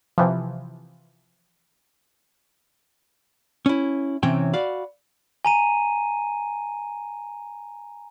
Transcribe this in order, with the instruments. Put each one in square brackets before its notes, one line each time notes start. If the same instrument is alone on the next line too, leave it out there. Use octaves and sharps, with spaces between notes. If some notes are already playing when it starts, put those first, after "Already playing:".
[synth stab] C3 E3 F3
[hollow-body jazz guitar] C#4 E4
C3 E3 C4 C#4 C#5 G5
F#4 D5 F5 B5
[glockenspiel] G#5 A#5 D#7